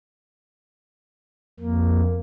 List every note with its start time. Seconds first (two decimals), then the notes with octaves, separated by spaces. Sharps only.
1.60 F2 A#3